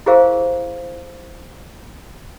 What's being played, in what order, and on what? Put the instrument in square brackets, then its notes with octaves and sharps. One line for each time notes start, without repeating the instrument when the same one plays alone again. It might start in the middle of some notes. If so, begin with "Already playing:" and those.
[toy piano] E4 G4 G#4 A#4 C5 F5